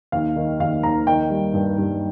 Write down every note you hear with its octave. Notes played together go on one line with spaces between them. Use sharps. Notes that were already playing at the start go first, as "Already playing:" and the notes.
D#2 F5
D#3
D#2 F5
D#2 A#5
D#3 G5
G3
G2
G2